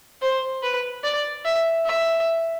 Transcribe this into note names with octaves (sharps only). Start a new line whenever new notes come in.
C5
B4
D5
E5
E5